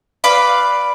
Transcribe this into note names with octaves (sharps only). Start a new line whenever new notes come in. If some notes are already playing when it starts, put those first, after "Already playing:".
B4 D5 F5 B5